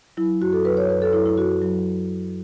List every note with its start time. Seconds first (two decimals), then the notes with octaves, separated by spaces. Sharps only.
0.17 F#3 E4
0.41 F#2 F#4
0.53 A4
0.65 F#3 B4
0.77 C#5
0.89 F#2 B4
1.02 A4
1.13 F#3 E4
1.26 E4
1.38 F#2 F#4
1.62 F#3